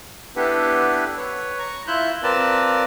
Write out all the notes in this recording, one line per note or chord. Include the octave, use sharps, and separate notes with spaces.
B3 D4 E4 G4 A4 B4
B4 C#5
A#5 C#6
E4 F4 E5 F#6 G6
C4 F4 A#4 B4 D5 A5